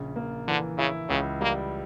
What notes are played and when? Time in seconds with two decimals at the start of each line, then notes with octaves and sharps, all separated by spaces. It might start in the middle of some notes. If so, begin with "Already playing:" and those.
Already playing: A#1 C#3
0.16 A#3
0.47 D3 E3
0.78 C#3 E4
1.09 C#2 C#3
1.41 G3 A#3